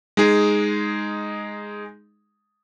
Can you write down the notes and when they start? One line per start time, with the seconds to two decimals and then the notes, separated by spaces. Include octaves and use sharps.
0.17 G#3 D#4 G#4